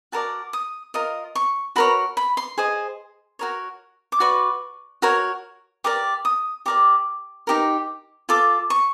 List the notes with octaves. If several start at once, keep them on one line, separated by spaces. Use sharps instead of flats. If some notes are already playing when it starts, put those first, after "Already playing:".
F#4 A#4 D5 A5
D#6
F4 A#4 D#5
C#6
F#4 A#4 C#5 B5
B5
C6
G#4 C5 D#5
F#4 A#4 C#5
D6
F#4 B4 D5 C#6
F#4 A#4 C#5
G4 A#4 D5 D6
D#6
G4 A#4 D5 D6
D#4 G4 A#4
F4 A4 D6
C#6